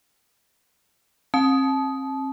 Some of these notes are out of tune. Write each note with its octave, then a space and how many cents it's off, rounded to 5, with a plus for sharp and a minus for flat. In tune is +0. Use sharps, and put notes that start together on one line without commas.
C4 +40 A5 -30